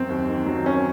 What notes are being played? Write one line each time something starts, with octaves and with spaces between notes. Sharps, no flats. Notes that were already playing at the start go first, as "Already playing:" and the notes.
Already playing: F#2 C4
D#2
D#3
F#3
C4 C#4